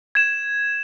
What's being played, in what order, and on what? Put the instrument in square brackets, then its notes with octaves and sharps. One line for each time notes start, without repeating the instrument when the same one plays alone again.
[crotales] G#6 E7